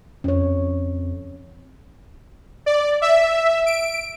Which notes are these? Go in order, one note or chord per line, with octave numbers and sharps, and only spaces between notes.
F2 C#4 C#5
D5
E5
D7